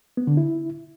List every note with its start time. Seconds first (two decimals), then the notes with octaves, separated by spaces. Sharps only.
0.17 B3
0.27 D3
0.37 E4